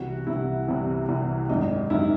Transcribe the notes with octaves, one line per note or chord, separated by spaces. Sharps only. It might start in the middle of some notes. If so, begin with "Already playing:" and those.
Already playing: C2 C3 E3 F#4
C2 C3 E3 E4
C2 C3 E3
C2 C3 E3
G#1 F#2 D#3 D#4
G#1 F#2 D#3 E4